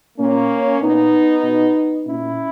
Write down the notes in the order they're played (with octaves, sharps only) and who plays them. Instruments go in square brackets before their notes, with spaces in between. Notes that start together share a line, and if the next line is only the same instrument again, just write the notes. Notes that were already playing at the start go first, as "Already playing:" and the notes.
[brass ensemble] A#2 A#3 C#4
A#2 B3 D#4
B2
A#2 C#4 E4